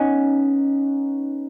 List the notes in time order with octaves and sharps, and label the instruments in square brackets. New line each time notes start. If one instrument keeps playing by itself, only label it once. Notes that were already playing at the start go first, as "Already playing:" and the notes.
Already playing: [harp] B3 C#4 D#4